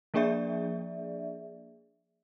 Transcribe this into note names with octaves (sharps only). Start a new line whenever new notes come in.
F3 A#3 D4 G#4 D5 E5